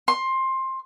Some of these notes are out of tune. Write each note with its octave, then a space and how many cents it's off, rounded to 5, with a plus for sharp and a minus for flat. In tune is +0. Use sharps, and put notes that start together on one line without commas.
C6 +15